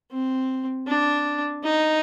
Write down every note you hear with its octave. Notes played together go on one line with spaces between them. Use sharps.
C4
D4
D#4